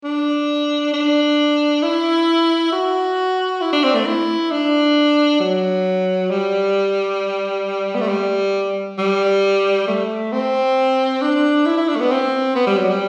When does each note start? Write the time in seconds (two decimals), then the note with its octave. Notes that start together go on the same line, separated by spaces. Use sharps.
0.04 D4
0.94 D4
1.83 E4
2.72 F#4
3.61 E4
3.73 D4
3.83 C4
3.94 A3
4.06 E4
4.51 D4
5.40 F#3
6.30 G3
7.95 B3
8.01 A3
8.09 G3
8.98 G3
9.88 A3
10.32 C4
11.22 D4
11.66 E4
11.77 E4
11.88 D4
11.96 A3
12.00 B3
12.11 C4
12.56 B3
12.67 G3
12.78 F#3
12.90 G3